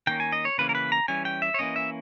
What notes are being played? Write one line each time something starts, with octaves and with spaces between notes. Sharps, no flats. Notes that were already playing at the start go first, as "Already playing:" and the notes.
D#3 A#3 C#4 G5
G#5
D#5
C#5
C#3 E3 A#3 C#4 B4
A#4
B4
A#5
E3 G3 C#4 G#5
G5
E5
C#5
E3 A#3 C#4 D#5
E5